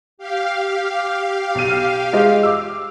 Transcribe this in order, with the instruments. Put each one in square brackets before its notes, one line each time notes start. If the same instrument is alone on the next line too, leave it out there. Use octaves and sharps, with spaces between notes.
[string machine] G4 F5
[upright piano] B1 D#7
G#3 F4 D#5
D6 E6